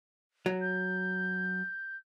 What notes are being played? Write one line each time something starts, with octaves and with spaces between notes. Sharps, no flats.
F#3
G6